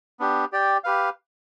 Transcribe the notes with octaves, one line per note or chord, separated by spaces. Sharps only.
B3 D4 G4
G4 D5 G5
G4 B4 F5